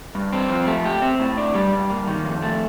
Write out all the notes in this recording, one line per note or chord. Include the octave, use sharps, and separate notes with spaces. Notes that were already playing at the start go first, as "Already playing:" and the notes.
G2
C4
F3
A3
G4
C4
A2
D4
G3
G2
A#3
D#3
F2
A3